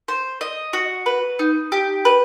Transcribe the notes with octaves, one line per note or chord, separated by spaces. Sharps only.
C5
D#5
F#4
B4
D#4
G4
B4